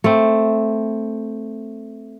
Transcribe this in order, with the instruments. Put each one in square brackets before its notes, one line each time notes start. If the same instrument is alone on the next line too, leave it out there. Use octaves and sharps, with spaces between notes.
[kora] A3 C4